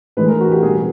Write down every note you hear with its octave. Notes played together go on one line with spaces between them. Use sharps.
A2 E3 G#3 B4
A#4
F#4
G4
B2 G3 G#4